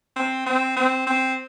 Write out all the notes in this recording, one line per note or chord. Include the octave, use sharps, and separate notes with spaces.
C4
C4
C4
C4